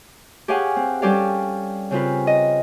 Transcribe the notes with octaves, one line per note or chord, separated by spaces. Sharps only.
G4 G#4 C#5 F5 F#5 G#5
C4
G3 C#4 G4 A4 D5 F5
C#3 C4 F4 B4
D#5